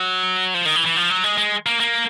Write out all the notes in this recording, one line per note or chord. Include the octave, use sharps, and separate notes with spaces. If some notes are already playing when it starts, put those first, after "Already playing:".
Already playing: F#3
F3
D#3
E3
E3
F3
F#3
G#3
G#3
A#3
A#3